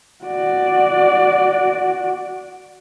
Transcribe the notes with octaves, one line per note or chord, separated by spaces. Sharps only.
F#4 D5